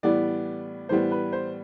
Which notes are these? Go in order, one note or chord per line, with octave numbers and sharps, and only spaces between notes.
A2 E3 G3 B3 D5
A2 E3 G3 B3 C5
B4
C5